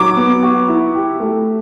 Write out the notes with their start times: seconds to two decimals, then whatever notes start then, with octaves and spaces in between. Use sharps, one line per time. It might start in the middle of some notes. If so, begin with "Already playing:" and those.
Already playing: F#3 D6
0.16 B3
0.43 F#4
0.68 E4
0.95 G4
1.20 A3